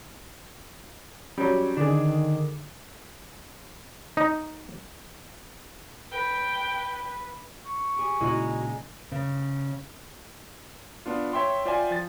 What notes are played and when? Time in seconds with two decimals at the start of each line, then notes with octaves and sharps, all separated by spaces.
1.38 F#3 G3 C#4
1.77 D3 D#3 D4 G#4
4.17 D#4
6.12 B4 G5
7.65 C#6
7.96 G4 G#4
8.20 A#2 C#3 G#3 D#4 E4 F#4
9.12 C#3
11.06 B3 D4 F4
11.33 C#5 E5 G5 C6
11.65 F4 C5 D5 E5 G5 G#5
11.91 F3 A6